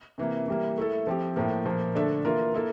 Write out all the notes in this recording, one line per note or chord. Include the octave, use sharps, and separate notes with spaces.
C3 E3 A#3
E3 G3 A#3
A3 E4 A4
F3 C4 G4
A2 F3 A#3
A#2 F3 A#3
D3 A3 D4 A4 E5
E3 A#3 F4 A#4
A#3 E4 A4 E5